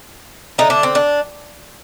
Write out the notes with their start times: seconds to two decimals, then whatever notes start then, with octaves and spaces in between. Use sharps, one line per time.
0.58 D3 A3 D#4
0.70 D4
0.83 C4
0.95 D4